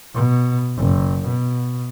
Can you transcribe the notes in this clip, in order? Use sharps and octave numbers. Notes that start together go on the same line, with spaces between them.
B2
F#1
B2